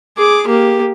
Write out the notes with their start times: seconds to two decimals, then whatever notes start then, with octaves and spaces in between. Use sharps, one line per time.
0.17 G#4 D6
0.47 A#3 G4